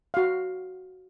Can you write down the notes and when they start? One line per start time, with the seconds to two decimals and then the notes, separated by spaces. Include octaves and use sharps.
0.14 F#4 F5